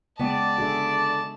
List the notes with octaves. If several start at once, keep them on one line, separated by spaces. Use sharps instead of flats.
C#3 G#3 B3 D5 E5 G5 A5
D3 F#4 G#4 E5